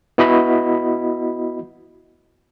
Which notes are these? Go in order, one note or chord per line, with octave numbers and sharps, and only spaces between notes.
B3 E4 F#4 D#5 B5